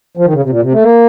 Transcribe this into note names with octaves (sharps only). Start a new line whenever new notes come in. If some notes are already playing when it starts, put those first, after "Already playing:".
F3
D#3
C#3
C3
A#2
C3
A3
A#3